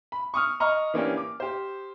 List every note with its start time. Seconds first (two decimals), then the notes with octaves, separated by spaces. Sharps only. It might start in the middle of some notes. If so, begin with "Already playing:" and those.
0.12 B5
0.34 C#6 D#6 F6
0.60 D#5 A#5 C#6 F6
0.94 E3 A#3 C#4 D4 G4
1.17 D6
1.40 G4 C5